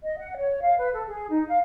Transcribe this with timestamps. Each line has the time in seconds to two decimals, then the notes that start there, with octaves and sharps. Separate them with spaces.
0.03 D#5
0.18 F#5
0.37 C#5
0.62 F5
0.77 B4
0.93 A4
1.07 G#4
1.30 D#4
1.48 F5